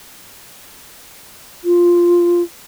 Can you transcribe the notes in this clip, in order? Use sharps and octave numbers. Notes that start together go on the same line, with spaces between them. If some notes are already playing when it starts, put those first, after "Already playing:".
F4